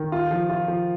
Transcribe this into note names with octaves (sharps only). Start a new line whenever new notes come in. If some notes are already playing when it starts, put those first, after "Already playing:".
Already playing: D#3
F4
F3
F4
F3